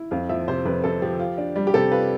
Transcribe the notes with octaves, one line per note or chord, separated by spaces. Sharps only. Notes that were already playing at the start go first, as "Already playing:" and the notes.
Already playing: E4
F2 F5
F3 E5
C3 C5
F2 B4
F2 A4
F3 G4
F4
D4
G3
G4
C3 A4
F4 B4